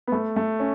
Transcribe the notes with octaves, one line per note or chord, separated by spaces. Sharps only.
B3
A3
A3
C#4